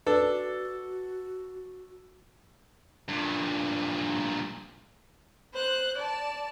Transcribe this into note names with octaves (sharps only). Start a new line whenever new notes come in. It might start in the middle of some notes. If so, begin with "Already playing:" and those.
D4 F#4 A4 B4
G2 A#2
C5 F#6
D5 A5